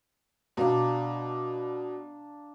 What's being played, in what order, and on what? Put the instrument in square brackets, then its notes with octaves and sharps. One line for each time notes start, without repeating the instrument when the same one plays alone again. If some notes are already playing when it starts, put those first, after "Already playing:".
[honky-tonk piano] B2 [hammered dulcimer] D4 F5 A#5